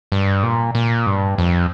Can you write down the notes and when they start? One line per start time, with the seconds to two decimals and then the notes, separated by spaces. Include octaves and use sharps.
0.12 G2
0.43 A#2
0.75 A#2
1.06 G2
1.38 F2